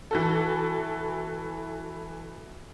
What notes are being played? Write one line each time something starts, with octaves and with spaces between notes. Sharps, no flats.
E3 F#4 A4